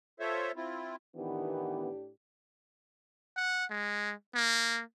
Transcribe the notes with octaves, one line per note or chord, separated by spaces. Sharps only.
F4 A4 C5 C#5 E5
C4 E4 F4
A2 D#3 E3 B3 D4 G4
F#5
G#3
A#3